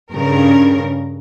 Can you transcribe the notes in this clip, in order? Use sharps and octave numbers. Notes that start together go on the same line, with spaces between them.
G2 C#3 A#4